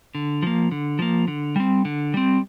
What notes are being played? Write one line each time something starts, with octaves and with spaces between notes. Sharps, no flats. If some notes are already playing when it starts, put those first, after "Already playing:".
D3
F3 A#3
D3
F3 A#3
D3
G3 C4
D3
G3 C4